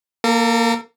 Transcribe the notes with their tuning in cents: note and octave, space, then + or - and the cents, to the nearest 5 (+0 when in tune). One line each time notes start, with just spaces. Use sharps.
A#3 +0 A4 +40